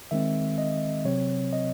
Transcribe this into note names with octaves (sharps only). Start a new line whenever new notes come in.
D#3 G#3 C4 E5
D#5
C3 F#3 C4 C#5
D#5